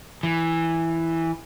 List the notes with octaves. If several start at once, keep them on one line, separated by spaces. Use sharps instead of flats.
E3